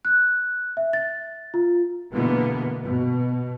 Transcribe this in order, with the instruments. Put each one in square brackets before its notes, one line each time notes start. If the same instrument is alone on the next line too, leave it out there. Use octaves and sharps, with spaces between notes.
[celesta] F#6
E5
A6
F4
[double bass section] B2 D3 E3 G#3 A#3 B3
B2